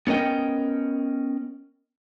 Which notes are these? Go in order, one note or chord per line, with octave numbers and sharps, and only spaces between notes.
B3 C#4 A#4 D#5 G5